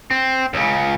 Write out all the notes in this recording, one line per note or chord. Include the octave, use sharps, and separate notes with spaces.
C4
C#2 C#3